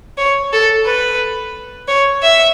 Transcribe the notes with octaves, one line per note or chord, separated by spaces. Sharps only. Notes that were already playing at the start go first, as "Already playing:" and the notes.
C#5
A4
B4
C#5
E5